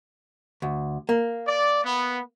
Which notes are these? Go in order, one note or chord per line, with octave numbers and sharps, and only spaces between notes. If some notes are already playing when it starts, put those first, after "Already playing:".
D2
A#3
D5
B3